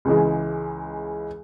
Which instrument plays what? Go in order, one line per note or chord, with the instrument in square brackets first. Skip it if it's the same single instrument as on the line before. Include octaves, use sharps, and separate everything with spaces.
[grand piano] C#2 C#3 E3 G#3